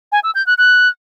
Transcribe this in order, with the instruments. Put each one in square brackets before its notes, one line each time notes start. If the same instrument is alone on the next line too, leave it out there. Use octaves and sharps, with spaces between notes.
[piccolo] G#5
E6
G6
F#6
F#6